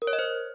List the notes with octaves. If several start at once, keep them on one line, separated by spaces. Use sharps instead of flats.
A#4
C#5
D#5
C5